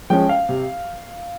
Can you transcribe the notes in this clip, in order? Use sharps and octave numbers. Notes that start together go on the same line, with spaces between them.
F3 G#3 C#4 G5
F5
C3